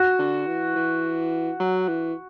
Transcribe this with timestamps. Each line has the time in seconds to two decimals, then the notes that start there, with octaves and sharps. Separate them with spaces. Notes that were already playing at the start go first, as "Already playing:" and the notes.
Already playing: F#4
0.19 D3
0.47 E3
0.75 E3
1.60 F#3
1.88 E3